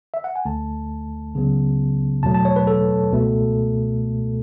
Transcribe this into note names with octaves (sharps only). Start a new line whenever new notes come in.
E5
F#5
G#5
D2 D3 A3 A5
C#2 C#3 F#3 B3
E2 B2 F#3 A3 A5
A5
C#5
B4
A4
C#2 B2 A3